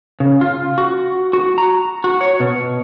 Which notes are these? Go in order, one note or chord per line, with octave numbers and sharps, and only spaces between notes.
C#3
F4
F#4
F#4
A#5
F#4
C#5
B2